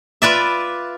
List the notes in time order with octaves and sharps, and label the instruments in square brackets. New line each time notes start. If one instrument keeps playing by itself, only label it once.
[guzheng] F4 B4 D5 E5